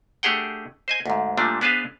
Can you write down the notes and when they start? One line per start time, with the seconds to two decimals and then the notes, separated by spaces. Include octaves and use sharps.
0.23 A3 D4 G4 G#4 F#5 G5
0.88 C5 D#5 G#5
1.06 D2 G#2
1.37 A#2 F3 G3 A3 D4
1.61 B3 D4 G#4 B4 C5 F5